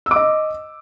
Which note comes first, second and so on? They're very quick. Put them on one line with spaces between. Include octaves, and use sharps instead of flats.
E6 D6 D#5